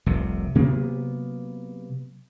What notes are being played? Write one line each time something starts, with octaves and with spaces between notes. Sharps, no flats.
F1 C2 C3
C3 F#3 A#3 B3